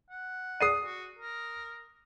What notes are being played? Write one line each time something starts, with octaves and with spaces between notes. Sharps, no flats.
F#5
G#4 D5 D#6 C7 D#7
F#4
A#4